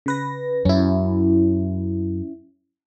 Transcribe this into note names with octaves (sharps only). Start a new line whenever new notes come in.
C#3 B4 A#6
F#2 C#4 E4